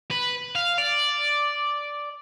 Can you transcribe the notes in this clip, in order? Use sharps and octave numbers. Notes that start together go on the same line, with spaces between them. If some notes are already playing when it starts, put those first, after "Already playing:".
B4
F5
D5